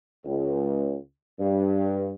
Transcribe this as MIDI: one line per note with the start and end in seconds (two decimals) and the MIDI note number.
0.25 0.96 37
1.39 2.12 43